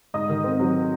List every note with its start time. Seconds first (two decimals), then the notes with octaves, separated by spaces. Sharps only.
0.14 G#2 D#5 D#6
0.29 D#3
0.44 C4
0.60 F#3